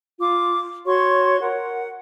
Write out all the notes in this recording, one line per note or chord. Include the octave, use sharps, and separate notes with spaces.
F4 D6
F#4 C#5 C6 C#6
A#4 F#5